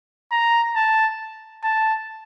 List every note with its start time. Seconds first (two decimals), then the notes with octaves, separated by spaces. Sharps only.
0.32 A#5
0.76 A5
1.64 A5